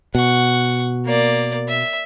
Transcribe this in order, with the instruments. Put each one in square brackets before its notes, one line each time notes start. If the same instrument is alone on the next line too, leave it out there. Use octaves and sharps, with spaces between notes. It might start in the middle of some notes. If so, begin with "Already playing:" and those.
[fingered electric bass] B2 [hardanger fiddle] F#5 C#6
[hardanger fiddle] A#3 D5
E5